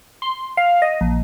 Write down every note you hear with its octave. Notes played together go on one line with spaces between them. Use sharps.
C6
F5
D#5
A#1